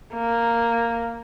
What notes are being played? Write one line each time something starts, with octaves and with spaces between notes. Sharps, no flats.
A#3